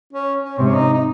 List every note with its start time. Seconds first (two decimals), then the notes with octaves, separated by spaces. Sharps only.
0.13 C#4
0.43 C#4
0.57 G#2 C3 C4
0.65 C#4
0.75 D#4
0.94 D#4